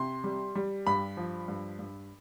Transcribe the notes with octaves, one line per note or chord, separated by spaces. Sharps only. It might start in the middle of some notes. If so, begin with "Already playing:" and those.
Already playing: C3 C6
G3
G3
G2 B5
F3
G2
G2